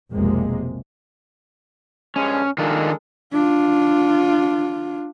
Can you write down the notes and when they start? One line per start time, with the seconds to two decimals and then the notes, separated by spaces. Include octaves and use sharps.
0.12 F1 B1 F2 C3 G#3 A#3
2.16 A#1 G2 G#3 C#4
2.58 D#3 G#3 D4 F4 A4 A#4
3.33 D4 F4